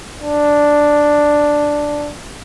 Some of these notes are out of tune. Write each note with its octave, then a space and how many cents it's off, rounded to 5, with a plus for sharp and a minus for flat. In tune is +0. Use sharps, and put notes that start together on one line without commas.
D4 +0